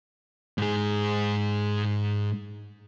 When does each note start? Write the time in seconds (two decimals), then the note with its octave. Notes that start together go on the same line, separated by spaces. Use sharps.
0.58 G#2 G#4